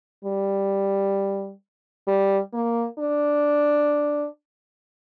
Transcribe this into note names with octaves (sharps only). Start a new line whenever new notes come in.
G3
G3
A#3
D4